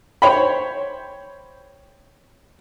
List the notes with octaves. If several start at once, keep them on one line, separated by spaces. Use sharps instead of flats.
C5 C#5 G5 B5